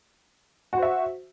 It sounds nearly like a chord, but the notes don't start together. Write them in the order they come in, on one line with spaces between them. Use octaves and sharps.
F#4 C5 E5